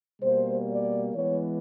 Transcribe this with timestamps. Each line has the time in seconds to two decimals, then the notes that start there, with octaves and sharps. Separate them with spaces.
0.22 B2 G3 A#3 C5
0.69 D5
1.15 E3 G#3 B3 C#5